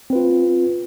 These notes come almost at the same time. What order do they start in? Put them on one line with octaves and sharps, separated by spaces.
C4 B4 F4